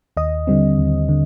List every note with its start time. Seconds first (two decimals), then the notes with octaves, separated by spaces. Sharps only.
0.17 D#2 D#5
0.47 D3 G3 C4
0.78 D#2
1.09 D3